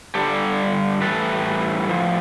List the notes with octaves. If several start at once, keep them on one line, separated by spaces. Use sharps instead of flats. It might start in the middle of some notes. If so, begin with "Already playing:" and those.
G2 D3 G3 G4 A4
A2 E3 G3 A4 B4
A2 F3